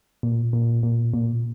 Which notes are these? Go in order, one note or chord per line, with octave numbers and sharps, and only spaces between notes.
A#2
A#2
A#2
A#2